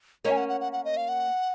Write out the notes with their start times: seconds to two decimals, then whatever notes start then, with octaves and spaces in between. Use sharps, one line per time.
0.25 A#3 C#4 D#5
0.31 G#5
0.37 F#5
0.49 F#5
0.61 F#5
0.72 F#5
0.85 D#5
0.97 F5
1.09 F#5